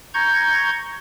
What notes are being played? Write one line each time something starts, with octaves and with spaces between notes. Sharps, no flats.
A#5 C#6 G6 G#6